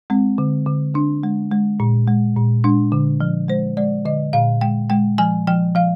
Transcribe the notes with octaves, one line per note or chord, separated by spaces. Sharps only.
G#3 C4
D3
D3
D3 D4
G#3
G#3
A#2
G#3
A#2
G#3 D4
D3
F3
G#3 C5
G#3 D5
D3 D#5
A#2 F5
G#3 G5
G#3 G5
F3 G#5
F3 G5
F3 F5